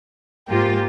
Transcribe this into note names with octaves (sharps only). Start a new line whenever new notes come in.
G#2 A#3 F4 G4